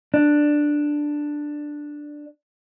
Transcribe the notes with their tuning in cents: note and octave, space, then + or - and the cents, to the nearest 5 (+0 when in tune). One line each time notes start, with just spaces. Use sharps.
D4 +5